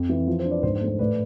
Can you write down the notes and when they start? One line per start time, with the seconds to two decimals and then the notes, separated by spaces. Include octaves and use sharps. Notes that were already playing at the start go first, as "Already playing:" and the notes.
Already playing: F2
0.09 E3
0.27 F3
0.40 C5
0.45 D4
0.51 B4 D5
0.63 G#2 C5
0.75 C5
0.81 A3
0.88 C5
0.99 A2 B4 D5